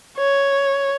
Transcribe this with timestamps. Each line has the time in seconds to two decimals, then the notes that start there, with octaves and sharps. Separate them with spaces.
0.18 C#5